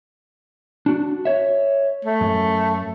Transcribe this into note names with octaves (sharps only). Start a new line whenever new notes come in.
D4 F#4
C#5 E5
A3
F#2